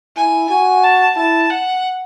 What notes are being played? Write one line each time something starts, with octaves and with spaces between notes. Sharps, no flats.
E4 G#5
F#4 G#5
A5
E4 A5
F#5